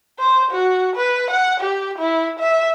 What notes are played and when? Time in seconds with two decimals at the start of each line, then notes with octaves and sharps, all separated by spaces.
0.19 C5
0.52 F#4
0.96 B4
1.30 F#5
1.60 G4
1.99 E4
2.40 E5